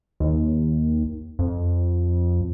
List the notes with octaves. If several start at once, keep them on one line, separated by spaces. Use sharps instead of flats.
D#2
F2